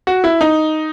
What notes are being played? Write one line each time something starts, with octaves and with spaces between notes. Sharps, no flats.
F#4
E4
D#4